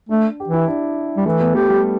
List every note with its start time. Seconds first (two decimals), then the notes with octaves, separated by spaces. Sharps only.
0.09 A3 D4
0.40 G4
0.48 E3
0.53 E4
0.68 D4
1.17 G3
1.26 E3 A3
1.40 B3
1.55 A3 G4
1.69 G3